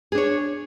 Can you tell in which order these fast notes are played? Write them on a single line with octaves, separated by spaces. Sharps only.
G#4 D4 C#5